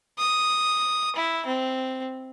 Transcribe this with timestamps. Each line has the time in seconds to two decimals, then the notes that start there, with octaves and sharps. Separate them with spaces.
0.19 D#6
1.16 E4
1.46 C4